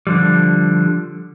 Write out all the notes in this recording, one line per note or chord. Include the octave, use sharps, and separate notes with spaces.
D3 F3 G3